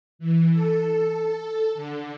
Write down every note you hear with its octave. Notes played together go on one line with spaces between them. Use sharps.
E3
A4
A4
D3